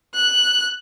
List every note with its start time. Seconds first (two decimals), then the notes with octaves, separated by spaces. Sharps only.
0.14 F#6